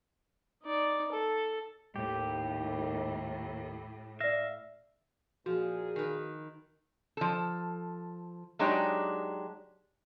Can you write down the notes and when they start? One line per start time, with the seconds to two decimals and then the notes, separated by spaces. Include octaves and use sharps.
0.63 D#4 D5
1.12 A4
1.96 D#2 A2 G4
4.20 D5 E5 F5 A#6
5.46 A#2 F3 F#4 G#4
5.96 D#3 B4
7.17 F3 A4
8.59 F#3 G#3 D4 D#4 G4 C#5